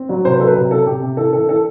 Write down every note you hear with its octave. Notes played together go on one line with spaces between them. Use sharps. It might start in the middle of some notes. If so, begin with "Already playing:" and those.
Already playing: C4
F#3
C3 C5
B4
F#3 A4
B4
C3
C3 A4
C3 G4
C3
E3 A4
E3 A4
E3 A4